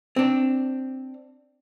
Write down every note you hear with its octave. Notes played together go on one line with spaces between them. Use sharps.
C4 D4